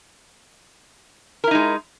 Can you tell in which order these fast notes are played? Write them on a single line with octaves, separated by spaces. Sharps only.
A#4 E4 D#4 G#3